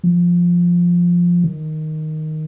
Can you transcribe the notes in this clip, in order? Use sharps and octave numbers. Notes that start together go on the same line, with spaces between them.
F3
D#3